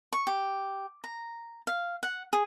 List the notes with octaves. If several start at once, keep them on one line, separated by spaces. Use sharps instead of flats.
C#6
G4
A#5
F5
F#5
G#4